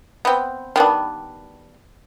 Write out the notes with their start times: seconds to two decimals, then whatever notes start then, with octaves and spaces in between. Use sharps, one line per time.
0.25 B3 C4
0.76 D#3 G3 B3 D4